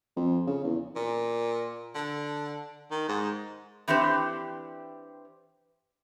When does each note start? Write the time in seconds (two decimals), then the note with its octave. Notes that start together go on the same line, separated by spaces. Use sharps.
0.16 F2
0.47 C#3
0.64 E2
0.96 A#2
1.95 D3
2.91 D#3
3.08 G#2
3.88 E3 C4 D4 G4 C5